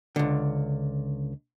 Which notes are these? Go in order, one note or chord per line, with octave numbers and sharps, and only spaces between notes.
C#2 D3